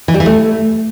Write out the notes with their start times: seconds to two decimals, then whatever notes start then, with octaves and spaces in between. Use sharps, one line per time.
0.08 E3
0.14 G3
0.20 E3
0.26 A3